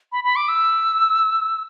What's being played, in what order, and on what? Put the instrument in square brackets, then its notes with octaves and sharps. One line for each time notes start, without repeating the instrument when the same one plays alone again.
[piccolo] B5
B5
D6
E6